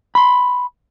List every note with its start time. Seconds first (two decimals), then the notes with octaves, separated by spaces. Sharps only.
0.15 B5 C6